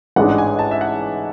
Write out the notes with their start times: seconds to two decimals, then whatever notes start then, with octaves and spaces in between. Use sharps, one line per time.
0.16 A1 G#2 G#3 D4 F#5
0.29 F#5
0.38 G#5
0.59 A5
0.71 E5
0.81 F#5